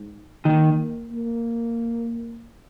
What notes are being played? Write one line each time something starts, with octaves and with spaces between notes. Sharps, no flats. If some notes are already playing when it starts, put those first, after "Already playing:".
Already playing: G#2
D#3 A#3
A#3